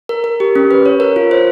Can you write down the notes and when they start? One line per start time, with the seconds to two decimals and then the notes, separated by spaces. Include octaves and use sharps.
0.09 A#4
0.24 A#4
0.40 G4
0.55 C#4
0.71 B4
0.86 C#5
1.00 A#4
1.16 F4
1.31 C5